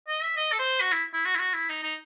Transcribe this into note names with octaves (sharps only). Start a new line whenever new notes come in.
D#5
E5
D#5
A4
C5
F#4
E4
E4
F#4
E4
F#4
E4
D#4
D#4